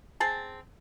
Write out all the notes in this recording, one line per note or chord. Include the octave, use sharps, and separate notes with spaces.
C4 G#4 A5